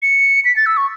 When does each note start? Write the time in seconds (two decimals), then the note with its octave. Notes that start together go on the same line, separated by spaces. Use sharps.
0.02 C#7
0.45 B6
0.56 A6
0.66 E6
0.77 C#6